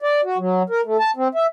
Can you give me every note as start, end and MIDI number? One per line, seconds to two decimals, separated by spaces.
0.02 0.21 74
0.24 0.37 66
0.38 0.63 54
0.70 0.81 70
0.85 0.97 57
1.00 1.11 81
1.16 1.28 60
1.35 1.46 76